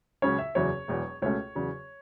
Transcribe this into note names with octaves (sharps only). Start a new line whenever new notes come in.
C#2 C#3 F#3 C#4 C#5
E5
F#1 E2 C#3 F#3 C#5
E1 E2 B2 F#3
C#2 B2 A3 C#4 C#5
E2 C#3 F#3